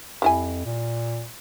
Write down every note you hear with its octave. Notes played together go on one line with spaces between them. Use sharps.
F2 G3 E4 G#5
A#2